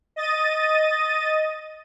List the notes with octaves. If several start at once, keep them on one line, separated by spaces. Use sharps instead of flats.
D#5 A6 D#7